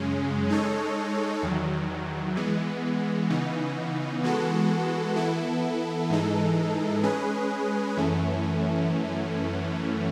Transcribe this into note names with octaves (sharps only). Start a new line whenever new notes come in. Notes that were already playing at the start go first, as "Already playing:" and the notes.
Already playing: F#2 C#3 G#3 C#4
G#3 D#4 A4 C#5
E2 D#3 F#3
E3 G#3 B3
C#3 E3 B3 D#4
E3 G#3 B3 F#4 A4
E3 B3 E4 A4
G#2 E3 G#3 D#4 A4
G#3 C#4 G#4 B4
F#2 E3 A3 C#4